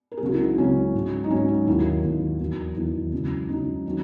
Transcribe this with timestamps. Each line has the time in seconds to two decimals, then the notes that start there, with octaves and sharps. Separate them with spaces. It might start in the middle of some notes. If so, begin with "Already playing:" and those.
0.12 A#4
0.18 G#4
0.21 C#2 C#3 F#3 F#4
0.32 E4
0.40 D#4
0.57 C#2 C#3 F#3 C#4
0.94 G#2 F#3
1.24 D#4
1.30 G#2 F#3 C#4
1.48 D#4
1.67 D#2 D#3 F#3 E4
1.85 E4
2.04 D#2 D#3 F#3
2.39 E2 D#3 F#3
2.76 E2 D#3 F#3 E4
3.12 C#2 C#3 F#3
3.49 C#2 C#3 F#3 D#4
3.86 D#3 F#3